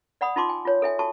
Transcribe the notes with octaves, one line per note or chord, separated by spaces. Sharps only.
D5 F#5 B5 D#6
D#4 F4 A5 C6 D6
G#5
F4 C#5
A4 E5 G#5
F#4 A4 A5 C#6